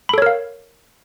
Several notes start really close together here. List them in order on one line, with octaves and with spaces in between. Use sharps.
B5 A4 C#5 A#4 F5